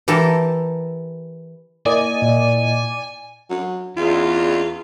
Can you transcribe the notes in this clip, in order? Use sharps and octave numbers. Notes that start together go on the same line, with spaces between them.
E3 G4 A4 A#4
A#3 E4 D5 D#5 G#5
A#2
F#3
E2 F4